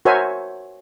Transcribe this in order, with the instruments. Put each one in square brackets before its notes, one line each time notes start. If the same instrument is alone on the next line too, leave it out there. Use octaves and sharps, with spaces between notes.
[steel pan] F#4 A#4 C5 C#5 E5 G#5